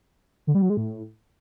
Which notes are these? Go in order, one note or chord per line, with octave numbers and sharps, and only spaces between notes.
D3
G3
F#3
G#3
A2